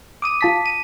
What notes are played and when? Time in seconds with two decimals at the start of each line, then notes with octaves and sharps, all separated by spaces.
0.22 D6 D#6 D#7
0.41 F4 A5 B6
0.66 D#7